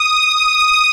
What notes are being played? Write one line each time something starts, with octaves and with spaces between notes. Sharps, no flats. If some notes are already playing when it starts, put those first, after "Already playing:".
Already playing: D#6